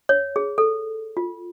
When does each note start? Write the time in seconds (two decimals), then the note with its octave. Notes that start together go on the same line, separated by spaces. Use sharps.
0.09 C#5
0.36 G#4
0.58 A4
1.17 F4